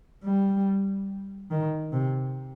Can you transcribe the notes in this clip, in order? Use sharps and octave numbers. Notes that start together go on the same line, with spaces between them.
G3
D#3
C3